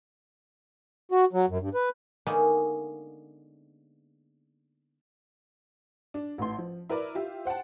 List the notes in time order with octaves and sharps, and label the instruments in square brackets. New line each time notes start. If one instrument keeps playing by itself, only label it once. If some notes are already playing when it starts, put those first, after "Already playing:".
[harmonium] F#4
F#3
F#2
G2
B4
[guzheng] D3 G#3 A#3 B3 C#4 D#4
[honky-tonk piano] D4
A1 A2 C6
F3
E4 A#4 B4 D5
F4 G4 E5
C5 F#5 G5 A5